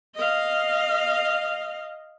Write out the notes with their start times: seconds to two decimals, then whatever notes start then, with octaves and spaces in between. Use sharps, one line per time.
0.15 D#5 F5